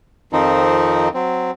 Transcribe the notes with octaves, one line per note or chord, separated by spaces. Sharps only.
F2 D#3 F3 C4 D#4
F#3 C4